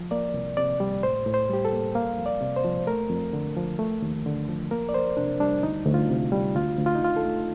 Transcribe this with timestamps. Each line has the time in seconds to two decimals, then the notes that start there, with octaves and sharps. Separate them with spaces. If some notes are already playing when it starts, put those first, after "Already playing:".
Already playing: F3
0.11 A#3 D5
0.34 C2
0.57 C3 D5
0.80 G3
1.03 A2 C5
1.26 A2
1.34 C5
1.50 G3 G4
1.65 A4
1.73 A#3
1.95 A#3 F5
2.18 F2
2.26 D5
2.41 C3
2.56 C5
2.64 F3
2.87 A3 A#4
3.10 F2
3.33 D3
3.56 F3
3.79 A3
4.02 D#2
4.26 D3
4.49 F3
4.71 A#3 A#4
4.89 D5
4.94 F2 C5
5.17 C3 D4
5.40 G3 D4
5.63 D2 D#4
5.86 D2
5.94 F4
6.09 C3
6.32 G3
6.55 D2 F4
6.79 D2
6.86 F4
6.95 D#4
7.02 D3 F4
7.16 A4
7.25 A3